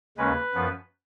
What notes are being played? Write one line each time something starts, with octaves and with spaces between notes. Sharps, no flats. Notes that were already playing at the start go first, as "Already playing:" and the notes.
D#2 C#3 G#3 C#4 B4
F#2 F3 B3